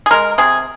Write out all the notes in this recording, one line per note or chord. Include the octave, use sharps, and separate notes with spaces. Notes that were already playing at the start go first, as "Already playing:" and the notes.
G#4
G#3 A#4
C3 G#4